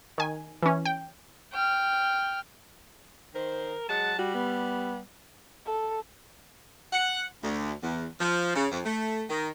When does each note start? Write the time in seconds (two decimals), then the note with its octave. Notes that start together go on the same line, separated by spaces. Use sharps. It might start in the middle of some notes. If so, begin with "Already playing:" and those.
0.18 D#3 G#5
0.62 E3 C#4
0.85 G5
1.52 G5 F6
3.35 D#3 A#4 C5
3.89 F#3 G#3 F#5 A5
4.19 G3 F#4
4.35 B3
5.66 A4
6.93 F#5
7.43 D2
7.83 E2
8.21 F3
8.56 C#3
8.72 F2
8.85 A3
9.30 D#3